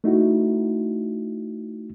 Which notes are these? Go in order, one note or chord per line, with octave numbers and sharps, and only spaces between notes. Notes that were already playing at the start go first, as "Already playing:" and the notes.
A3 D#4 E4 F#4